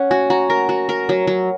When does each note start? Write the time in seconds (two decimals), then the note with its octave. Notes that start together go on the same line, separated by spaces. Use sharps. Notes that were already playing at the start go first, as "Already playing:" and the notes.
Already playing: C#4 F#5
0.11 F#4 G#5
0.30 F#4 A#5
0.50 A#4 A#5
0.69 F#4
0.89 A#4
1.09 F#3
1.27 F#3